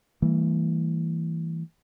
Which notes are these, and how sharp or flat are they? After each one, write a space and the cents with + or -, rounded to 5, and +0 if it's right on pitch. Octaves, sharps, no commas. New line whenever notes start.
E3 -5 G3 +0 A#3 -45